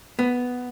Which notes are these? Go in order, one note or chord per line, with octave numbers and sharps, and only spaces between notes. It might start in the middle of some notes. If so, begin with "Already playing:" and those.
B3